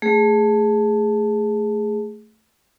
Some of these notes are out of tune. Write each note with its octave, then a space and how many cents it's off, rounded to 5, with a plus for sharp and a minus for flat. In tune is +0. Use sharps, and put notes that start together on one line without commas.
A3 +0 G#4 +0